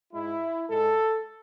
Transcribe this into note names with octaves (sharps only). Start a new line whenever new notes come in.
G#2 G#3 E4
G#2 G#3 A4